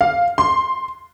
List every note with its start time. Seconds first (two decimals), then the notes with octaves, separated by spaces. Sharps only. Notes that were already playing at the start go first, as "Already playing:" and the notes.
0.01 F5
0.38 C6